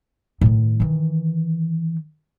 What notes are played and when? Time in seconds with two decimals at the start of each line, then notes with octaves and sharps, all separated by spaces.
0.41 A2 D#3
0.80 D#3 E3